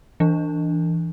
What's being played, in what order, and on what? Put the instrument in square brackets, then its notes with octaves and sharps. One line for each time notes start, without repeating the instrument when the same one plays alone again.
[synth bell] E3 D4